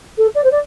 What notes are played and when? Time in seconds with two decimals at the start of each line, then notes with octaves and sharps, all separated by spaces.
0.18 A4
0.35 D5
0.44 C5
0.51 D5